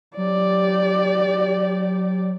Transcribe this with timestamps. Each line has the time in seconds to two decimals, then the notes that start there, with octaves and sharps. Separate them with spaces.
0.17 F#3 G4 D5